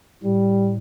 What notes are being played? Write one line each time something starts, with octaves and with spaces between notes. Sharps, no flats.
A2 G3